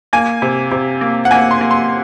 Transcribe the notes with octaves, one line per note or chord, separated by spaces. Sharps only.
A#3 G#5
C3
C3
A#3
F#5
A#3 G#5
C6
A#3
C6